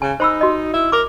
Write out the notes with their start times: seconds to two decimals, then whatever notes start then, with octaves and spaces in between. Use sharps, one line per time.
0.02 C#3 G#5
0.20 D#4 C5 B5 E6
0.41 F#4 D#5
0.73 E4
0.92 A#4 D6